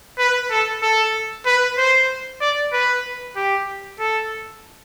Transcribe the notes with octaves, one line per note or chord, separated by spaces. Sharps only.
B4
A4
A4
B4
C5
D5
B4
G4
A4